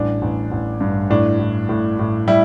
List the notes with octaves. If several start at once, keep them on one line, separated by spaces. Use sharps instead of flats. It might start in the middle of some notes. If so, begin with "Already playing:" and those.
Already playing: A1 G3 D4
A1
A1
G2
A2 D4
A2
A2
A2
G3 E4